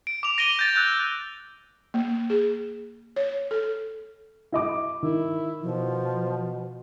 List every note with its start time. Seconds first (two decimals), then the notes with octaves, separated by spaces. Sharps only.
0.07 D7
0.23 D6 F7
0.38 A#6 D7 D#7 F7 G7
0.59 G6 A6
0.76 E6 F#6 G6
1.94 A#3
2.30 G#4
3.16 C#5
3.51 A4
4.52 E4 D#5 D6
5.03 D#3 E4
5.62 B2 F3